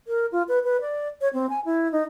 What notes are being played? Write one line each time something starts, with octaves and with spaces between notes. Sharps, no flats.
A#4
F4
B4
B4
D5
C#5
C4
G#5
E4
D#4